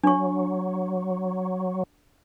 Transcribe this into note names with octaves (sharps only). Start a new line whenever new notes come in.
F#3 D4 C#6